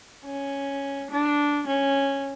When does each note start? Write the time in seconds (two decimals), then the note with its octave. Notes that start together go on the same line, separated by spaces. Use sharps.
0.25 C#4
1.11 D4
1.67 C#4